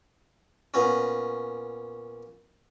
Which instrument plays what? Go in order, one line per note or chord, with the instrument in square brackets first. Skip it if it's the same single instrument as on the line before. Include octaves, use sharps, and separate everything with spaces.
[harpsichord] A#2 B3 C#4